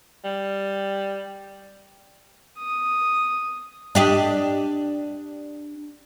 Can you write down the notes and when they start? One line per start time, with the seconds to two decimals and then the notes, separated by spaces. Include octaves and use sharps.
0.24 G3
2.59 D#6
3.95 D4 G4 D#5